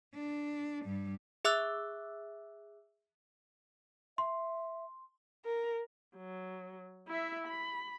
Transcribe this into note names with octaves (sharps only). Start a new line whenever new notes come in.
D4
G2 G3
G#4 E5 D6 E6 F#6
E5 C6
A#4
F#3
E4 E5
B5